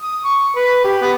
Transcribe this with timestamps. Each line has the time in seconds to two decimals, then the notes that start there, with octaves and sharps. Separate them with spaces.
0.02 D#6
0.24 C#6
0.56 B4
0.84 G4
1.02 B3